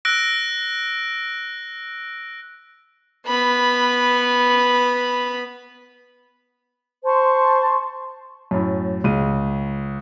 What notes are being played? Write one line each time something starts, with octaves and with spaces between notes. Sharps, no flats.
E6 F#6 A#6 D7
B3 B5
C5 A5 C6 C#6
F#2 A2
C#2 D#7